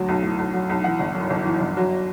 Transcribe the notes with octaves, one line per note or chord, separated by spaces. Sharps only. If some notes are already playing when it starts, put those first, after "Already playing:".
Already playing: D2 F#3
B1
A2
B1
F#3
B1
E3 F#5
G1
F#2
G1
E3
G1
F#3